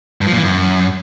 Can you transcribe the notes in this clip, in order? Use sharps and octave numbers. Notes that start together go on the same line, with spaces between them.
G2
F3
A#2
E3
F#2